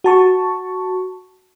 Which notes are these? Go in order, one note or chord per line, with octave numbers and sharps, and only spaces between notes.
F#4 A5 C#6